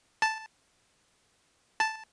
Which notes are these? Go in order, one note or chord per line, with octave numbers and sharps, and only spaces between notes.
A5
A5